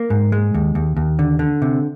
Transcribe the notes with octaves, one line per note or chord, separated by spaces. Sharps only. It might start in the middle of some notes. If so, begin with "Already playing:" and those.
Already playing: A#3
G#2
G#3
D#2
D#2
D#2
D3
D3
C3